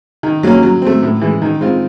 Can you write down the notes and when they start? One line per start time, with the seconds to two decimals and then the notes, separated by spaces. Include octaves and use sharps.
0.23 D#3
0.43 F#3 A#3 C#4
0.63 F#3
0.82 A3 C4
1.03 A2
1.21 E3 G#3
1.42 D#3
1.61 G#3 C4 F4